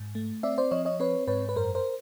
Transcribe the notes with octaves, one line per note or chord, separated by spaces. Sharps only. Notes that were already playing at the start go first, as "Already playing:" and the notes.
Already playing: G#2
A3
C4 D5 E5
C5 D5
F3 C#5 D#5
C#5 D#5
C4 B4 C#5
G#2 B4 C#5
B4
F#2 A#4 C5
A#4 C5